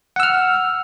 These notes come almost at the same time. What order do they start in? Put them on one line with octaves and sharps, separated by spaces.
F#5 E6 F6